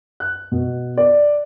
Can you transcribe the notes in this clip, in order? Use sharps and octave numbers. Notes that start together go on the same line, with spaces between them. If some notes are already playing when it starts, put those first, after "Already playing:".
F#6
B2
D5